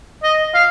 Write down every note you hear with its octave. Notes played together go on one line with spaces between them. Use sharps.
D#5
F5